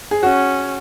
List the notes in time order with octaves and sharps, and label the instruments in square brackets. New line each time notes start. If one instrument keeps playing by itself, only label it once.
[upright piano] G#4
[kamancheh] C#4 [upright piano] F#4